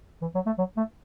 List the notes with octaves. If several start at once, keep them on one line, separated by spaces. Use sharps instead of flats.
E3
F#3
A3
F#3
A3